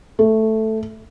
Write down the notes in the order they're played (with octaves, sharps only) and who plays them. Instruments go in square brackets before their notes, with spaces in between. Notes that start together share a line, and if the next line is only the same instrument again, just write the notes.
[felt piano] A3